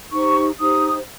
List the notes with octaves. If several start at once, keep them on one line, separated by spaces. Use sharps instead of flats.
D#4 G4 C5 C#6
D#4 G4 C5 D#6